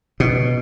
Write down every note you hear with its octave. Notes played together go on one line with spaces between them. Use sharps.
B2